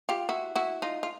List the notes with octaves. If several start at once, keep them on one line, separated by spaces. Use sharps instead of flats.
F4 G4
E4 F#4
E4 F#4
D#4 F4
F4